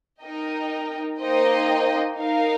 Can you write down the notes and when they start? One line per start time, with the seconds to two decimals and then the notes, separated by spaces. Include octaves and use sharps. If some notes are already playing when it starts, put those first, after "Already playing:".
0.22 D#4 A#4 D#5 G5
1.18 A#3 D#4 C5 D#5 G5
2.14 D#4 A#4 F5